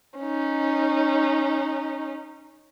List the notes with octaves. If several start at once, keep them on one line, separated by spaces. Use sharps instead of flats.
C#4 D#4